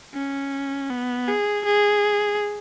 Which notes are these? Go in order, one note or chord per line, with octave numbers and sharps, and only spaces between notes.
C#4
B3
G#4
G#4